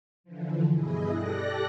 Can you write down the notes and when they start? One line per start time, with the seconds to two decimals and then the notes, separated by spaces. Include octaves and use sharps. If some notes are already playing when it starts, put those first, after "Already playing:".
0.24 D3 E3 F3
0.71 G2 B2 E4 G#4 D#5
1.11 G4 A4 D5 F#6 A#6